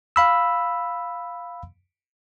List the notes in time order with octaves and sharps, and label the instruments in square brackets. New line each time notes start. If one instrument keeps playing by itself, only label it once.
[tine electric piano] F5 B5 E6